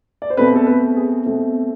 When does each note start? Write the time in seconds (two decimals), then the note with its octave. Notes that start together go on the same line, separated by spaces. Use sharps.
0.22 D5
0.30 C5
0.37 B2 A3 C4 B4
0.56 A4
0.67 B4
0.97 G#4
1.26 B2 A3 C4